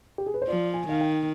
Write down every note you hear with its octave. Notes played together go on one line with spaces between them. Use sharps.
G4
G#4
B4
C5
F3 D5
G#5
D#3 F5
G5